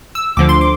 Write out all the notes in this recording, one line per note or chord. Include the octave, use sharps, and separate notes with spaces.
E6
D2 D3 F3 D6
C6
D6